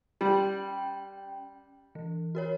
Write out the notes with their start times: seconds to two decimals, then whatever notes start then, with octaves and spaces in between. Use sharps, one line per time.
0.21 G3 C#4 G5
1.95 E3
2.35 F#4 A#4 C#5